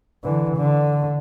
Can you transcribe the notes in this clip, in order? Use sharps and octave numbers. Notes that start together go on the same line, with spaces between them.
D3 E3
D3